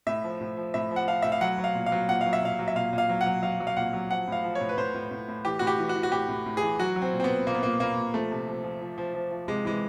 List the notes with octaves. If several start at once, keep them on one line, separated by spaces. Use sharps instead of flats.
A2 E5
F3
A2
F3
A2 E5
F3
F#5
F3 F5
A2 E5
F5
F#3 F#5
F#3
F5
A#2
F5
F#3
A#2 F#5
F#3 F5
E5
A#2 F5
F#3
E5
A#2 F5
A#2
F5
F#3
F#5
F#3
F#3 F5
F#3
F5
A#2 F#5
F#3
F3 F#5
A2 F5
F3
C#5
A2
B4
A2 C5
A2
A2
A2
E3 G4
A2 F#4
G4
E3
F#4
E3
F#4
A2 G4
A2
A2
G#4
E3
F#3 F#4
F#3
C4
A#2
C4
B3
A#2
A#2 A#3
B3
A#2 A#3
A#2 A#3
A#2
F3 A3
C3
F3
F3
F3
F3
F3
F3
C3 G#3
E3 G#3